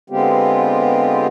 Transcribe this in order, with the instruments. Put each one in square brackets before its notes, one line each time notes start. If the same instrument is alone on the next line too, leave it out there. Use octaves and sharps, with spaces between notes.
[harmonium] D3 G#3 B3 C4 F4 G4